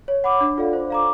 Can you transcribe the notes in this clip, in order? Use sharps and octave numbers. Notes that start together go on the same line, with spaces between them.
C#5
F#5 B5 D6
D4
F4 A4 D5 F5
C5
F5 A#5 D6